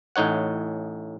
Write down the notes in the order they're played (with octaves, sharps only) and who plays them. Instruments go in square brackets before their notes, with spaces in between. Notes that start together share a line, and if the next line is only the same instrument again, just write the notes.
[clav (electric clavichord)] A1 A2 D#4 C#5 F#5